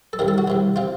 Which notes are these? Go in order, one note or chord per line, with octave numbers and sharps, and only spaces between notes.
A4
C2 C3 D#3 A#4
A4
F#4
C2 C3 D#3
C3 F3 F4